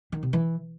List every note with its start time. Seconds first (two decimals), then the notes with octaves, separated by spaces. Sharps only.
0.12 D#3
0.23 C3
0.33 E3